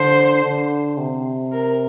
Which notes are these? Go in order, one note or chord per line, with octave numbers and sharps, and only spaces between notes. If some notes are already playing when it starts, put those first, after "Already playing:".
Already playing: D3 C5
D3
C3
A#4